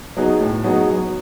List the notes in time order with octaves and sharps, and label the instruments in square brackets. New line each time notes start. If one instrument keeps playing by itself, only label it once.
[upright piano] F#3 B3 D#4 G#4
A2
F#3 B3 D#4 G#4
F#3